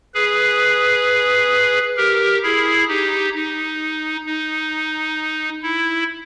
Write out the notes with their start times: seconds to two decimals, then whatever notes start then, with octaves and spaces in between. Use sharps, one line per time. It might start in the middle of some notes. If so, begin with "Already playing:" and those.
0.14 G#4 B4
1.97 G4 A#4
2.43 E4 G#4
2.88 D#4 G4
3.34 D#4
4.26 D#4
5.62 E4